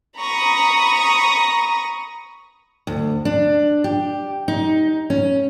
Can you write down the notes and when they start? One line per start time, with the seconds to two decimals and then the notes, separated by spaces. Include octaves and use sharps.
0.19 A#5 B5 C#6 D#6
2.87 D2
3.25 D4
3.84 G4
4.48 D#4
5.10 C#4